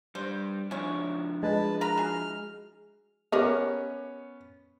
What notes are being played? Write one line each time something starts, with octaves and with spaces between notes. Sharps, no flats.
G3 D4 C5
F3 C#4 D4 E4 C#5
G#3 B4 A5
A#4 A#5 B5 F6
F#4 G#4
B3 C#4 G4 A#4 D#5